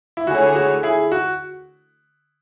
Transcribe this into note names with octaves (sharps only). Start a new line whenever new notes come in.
E4
D3 A3 E4 F#4 G#4 C#5
F#4
E4 G#4
F#4